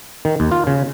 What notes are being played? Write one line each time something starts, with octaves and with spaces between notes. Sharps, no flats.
D#3
D#2
F4
C#3